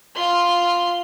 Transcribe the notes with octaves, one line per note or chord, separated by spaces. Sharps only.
F4 C6